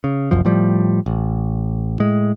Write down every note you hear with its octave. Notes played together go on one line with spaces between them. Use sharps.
C#3
F#1 C2 F#2 F3
A2 F3 G3
A1
A2 G#3